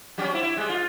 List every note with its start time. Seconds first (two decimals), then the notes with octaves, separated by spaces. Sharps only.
0.18 F#3 G3 C#4
0.31 C4 E4
0.43 E4
0.57 G3 G#3
0.69 F4